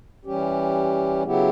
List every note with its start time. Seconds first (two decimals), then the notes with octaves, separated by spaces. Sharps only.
0.25 E3 G3 C#4 G4
1.23 C#3 F#3 B3 E4 G4